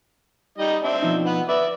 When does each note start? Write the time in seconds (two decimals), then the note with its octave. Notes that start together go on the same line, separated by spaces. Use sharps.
0.58 G3 D#4 D#5
0.84 C4 D4 E5
1.02 B2 F3 D#4
1.26 B4 F#5
1.49 B4 D5 E5